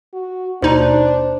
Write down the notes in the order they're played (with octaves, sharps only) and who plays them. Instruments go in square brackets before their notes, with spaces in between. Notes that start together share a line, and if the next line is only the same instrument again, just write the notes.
[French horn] F#4
[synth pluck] D#2 B2 D#4 [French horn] D4 [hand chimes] C5